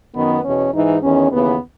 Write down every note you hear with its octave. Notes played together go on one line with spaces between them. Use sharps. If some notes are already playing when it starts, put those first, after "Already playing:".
F#2 D#3 B3
E2 B2 C#4
G#2 E3 D#4
E2 D#3 C#4
D#2 C#3 E3 B3